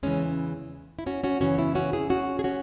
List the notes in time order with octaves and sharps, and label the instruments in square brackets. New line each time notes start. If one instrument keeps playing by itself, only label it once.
[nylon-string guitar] E2 C#3 E3 G#3 C#4
E4
C#4 F#4
C#4 F#4
F#2 C#3 E3 C#4 F#4
B3 E4
C#4 F#4
E4 G#4
C#4 F#4
G#4
C#4 F#4